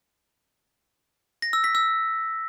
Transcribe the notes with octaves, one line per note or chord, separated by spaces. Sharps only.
A#6
E6
B6
E6